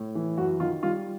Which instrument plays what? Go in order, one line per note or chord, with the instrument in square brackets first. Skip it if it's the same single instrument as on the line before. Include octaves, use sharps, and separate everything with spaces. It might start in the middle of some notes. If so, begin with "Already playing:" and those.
Already playing: [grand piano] A2
E3
F#2 F#4
D#3 F4
G3 F4